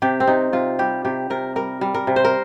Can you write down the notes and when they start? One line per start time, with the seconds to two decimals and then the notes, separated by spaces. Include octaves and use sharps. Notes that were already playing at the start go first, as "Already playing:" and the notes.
0.02 C3 G4
0.20 C4
0.27 C3 D#4
0.53 C3 F4
0.79 G3 G4
1.05 C3 G4
1.30 C3 A#4
1.56 G3 A#4
1.81 G3
1.94 A#4
2.07 C3
2.16 C5
2.25 A#4